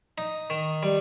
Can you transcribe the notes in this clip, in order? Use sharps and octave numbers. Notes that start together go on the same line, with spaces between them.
D#4
D#3
G3